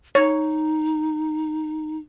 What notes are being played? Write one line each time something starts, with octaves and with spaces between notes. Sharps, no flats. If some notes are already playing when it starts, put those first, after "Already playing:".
D#4 C#5